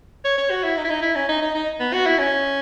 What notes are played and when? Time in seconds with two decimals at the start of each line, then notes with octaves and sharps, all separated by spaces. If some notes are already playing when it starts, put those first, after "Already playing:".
0.24 C#5
0.37 C#5
0.50 F#4
0.64 E4
0.77 D#4
0.84 E4
0.90 D#4
1.02 E4
1.15 C#4
1.29 D#4
1.42 D#4
1.55 D#4
1.80 B3
1.93 F#4
2.06 E4
2.18 C#4